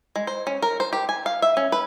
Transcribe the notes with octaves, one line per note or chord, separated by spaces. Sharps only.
G#3
C5
C#4
A#4
C5
G4
G#5
F5
E5
C#4
B4